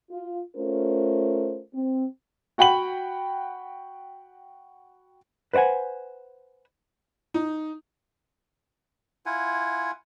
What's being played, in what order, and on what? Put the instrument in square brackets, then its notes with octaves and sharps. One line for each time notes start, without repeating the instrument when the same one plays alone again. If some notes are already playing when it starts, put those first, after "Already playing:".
[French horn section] F4
A3 C#4 F4 A#4 C5
C4
[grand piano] F#4 F#5 G5 B5 F#7
[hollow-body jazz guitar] B4 C5 D5 F#5 G#5
[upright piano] D#4
[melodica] E4 F4 F#5 G#5